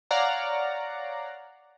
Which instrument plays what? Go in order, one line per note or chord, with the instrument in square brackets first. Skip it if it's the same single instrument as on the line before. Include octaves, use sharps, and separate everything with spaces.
[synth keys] C#5 D5 F5 F#5 A#5